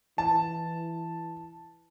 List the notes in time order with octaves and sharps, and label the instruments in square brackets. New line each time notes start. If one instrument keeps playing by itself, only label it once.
[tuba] E3 [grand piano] A5